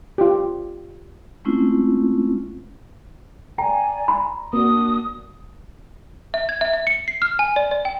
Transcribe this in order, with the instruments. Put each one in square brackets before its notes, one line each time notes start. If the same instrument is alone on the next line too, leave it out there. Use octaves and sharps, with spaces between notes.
[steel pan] F4 G4
[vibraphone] G#3 A3 C4 C#4 E4 F4
[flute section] D5 G#5 [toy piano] G5 [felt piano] A#5
[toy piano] B5 C6
[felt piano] A#3 [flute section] D4 F#4 [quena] D#6
[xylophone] E5
G#6
E5
E5
C#7
C7
F6
G#5
D5
D5
G5